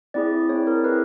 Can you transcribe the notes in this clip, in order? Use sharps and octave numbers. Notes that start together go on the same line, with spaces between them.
C4 E4 G#4 D5
C4 E4 G#4 C#5
A#4
C4 E4 G#4 B4